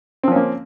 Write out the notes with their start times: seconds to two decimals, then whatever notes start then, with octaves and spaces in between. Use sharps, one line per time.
0.24 C4
0.28 F3
0.32 C#4
0.36 A#3